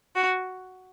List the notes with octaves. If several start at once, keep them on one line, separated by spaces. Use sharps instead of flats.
F#4